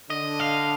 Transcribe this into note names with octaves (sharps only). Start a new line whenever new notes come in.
D3 D#5
F5